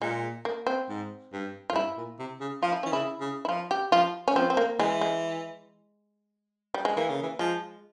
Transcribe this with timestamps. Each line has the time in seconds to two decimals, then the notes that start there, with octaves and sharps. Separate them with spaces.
0.02 A#2 G#3
0.45 A#3
0.67 C4
0.89 G#2
1.33 G2
1.70 F2 F4
1.75 G2 E4
1.97 A#2
2.19 C3
2.40 C#3
2.62 F3 F4
2.72 E4
2.83 E3 C#4
2.92 C#3 E4
3.21 C#3
3.45 E4
3.49 F3 F4
3.71 G4
3.92 F3 F4
4.28 C#4
4.36 F3 C4
4.50 C4
4.57 A#3
4.79 E3 G#3
5.01 G#3
6.74 G3
6.85 G#3
6.97 E3 A#3
7.09 C#3
7.22 E3
7.39 F3 G#3